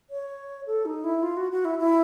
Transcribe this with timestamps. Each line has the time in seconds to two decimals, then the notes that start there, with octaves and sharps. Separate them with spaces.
0.10 C#5
0.67 A4
0.85 D#4
1.04 E4
1.23 F4
1.37 F#4
1.51 F#4
1.65 E4
1.79 E4